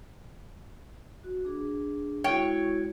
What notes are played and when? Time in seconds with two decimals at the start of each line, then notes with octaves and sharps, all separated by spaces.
1.24 F#4
1.45 D4 G#4
2.24 G#3 E4 F#4 C#5 G5